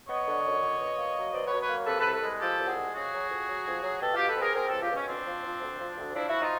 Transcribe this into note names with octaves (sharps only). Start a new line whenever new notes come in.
B3 C#5 D#5
D3
F#2
D3
B2
A#3
F#3
B2 C5 D5
B4 C#5
F#3
B4 C#5
A#3
C3 A4 B4
C2 A4 B4
A4 B4
G#3
F3 G4 A4
C2
F#4 G#4
G#3
C#3 F#4 G#4
F#3
F2
F#3
F2
F#3
B2 G4 A4
B2 F4 G4
A4 B4
C4
G#4 A#4
C4 G#4 A#4
C#2 G4 A4
F4 G4
B2 C#4
D2 C4 D4
F3
F3
D2
F3
D2
F3 D4 E4
F3 E4 F#4
D#4 F4